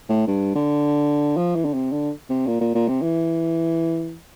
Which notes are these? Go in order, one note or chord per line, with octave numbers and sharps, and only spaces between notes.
A2
G2
D3
F3
E3
D3
C3
D3
C3
A#2
A#2
A#2
C3
E3